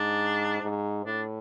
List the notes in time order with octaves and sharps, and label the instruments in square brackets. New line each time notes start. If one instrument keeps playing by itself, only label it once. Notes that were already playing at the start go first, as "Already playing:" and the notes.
Already playing: [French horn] G#2 [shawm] D4
[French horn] G#2
[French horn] A2 [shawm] D4